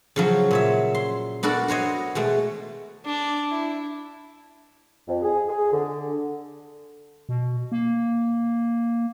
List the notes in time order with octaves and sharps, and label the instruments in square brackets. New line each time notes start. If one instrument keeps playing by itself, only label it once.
[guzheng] C#3 F3 F#3
A#2 C#5 E5
C6
B3 D4 F#4 A4 A#4
F#4 C5 C#5 D#5
B2 G#3 A3
[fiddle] D4
E4
[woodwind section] F2
G#4
G#4
D3
[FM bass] B2
A#3